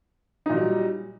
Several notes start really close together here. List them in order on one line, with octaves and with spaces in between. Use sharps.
D#4 A#2 F#3 G3